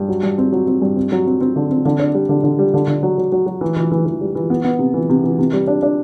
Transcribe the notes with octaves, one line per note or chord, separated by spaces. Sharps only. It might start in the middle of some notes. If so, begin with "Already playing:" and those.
Already playing: G2
F#3
G2
C4
F#3
C4
G2
C4
F#3
C4
C4
D3
C4
D3
D4
G3
D3
D3
G3
D3
D3
F#3
F#3
F#3
F#3
E3
E3
E3
E3
G3
E3
B3
B3
C3
E3
C3
E3
C3
G3
D4
D4